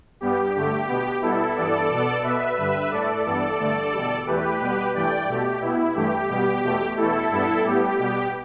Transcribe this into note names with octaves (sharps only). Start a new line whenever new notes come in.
G2 G3 B3 G4
G2 D3 A3 G4
B2 B3
B2 G3 B3 E4 A4
G2 E3 B3 A4 D5
B2 B3
B2 B3 B4 E5
G2 D3 G3 B4 E5
A2 A3 A4 D5
G2 E3 B3 A4 D5
G2 D3 A3
E2 B2 G3
E2 E3 A3 G4 B4
B2 G3 B3
G2 E3 A3 D5 G5
B2 A3 G4
B2 B3 E4
G2 E3 A3 G4
B2 G3 B3
E2 B2 A3
E2 B2 A3 E4 A4
G2 G3 B3 E4 A4
A2 G3 B3 G4
B2 G3 B3